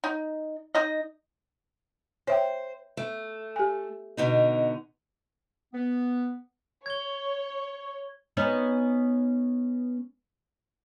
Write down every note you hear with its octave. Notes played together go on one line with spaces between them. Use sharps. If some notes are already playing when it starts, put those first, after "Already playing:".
D#4
D#4 D#5
C5 C#5 E5 G5
A3
G4 G#5
B2 D3 D#4
B3
C#5 G#6 G7
B3 C#4 D#4